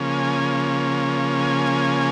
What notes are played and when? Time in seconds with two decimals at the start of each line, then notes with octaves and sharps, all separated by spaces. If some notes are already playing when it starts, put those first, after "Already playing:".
Already playing: C#3 F3 A#3 C#4
0.10 G#5
1.40 G#5